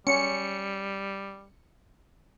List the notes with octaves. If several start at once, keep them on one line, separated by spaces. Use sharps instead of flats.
G3 C#4 C#7